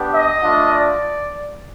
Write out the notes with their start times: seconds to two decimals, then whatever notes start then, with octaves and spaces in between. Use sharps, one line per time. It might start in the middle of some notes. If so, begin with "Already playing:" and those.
Already playing: B3 D4 G4
0.12 D#5
0.42 A3 D4 F4
0.72 D5